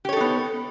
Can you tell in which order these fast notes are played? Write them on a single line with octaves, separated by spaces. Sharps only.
G4 C#5 A4 D#4 B3